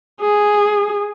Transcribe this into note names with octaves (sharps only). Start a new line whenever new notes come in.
G#4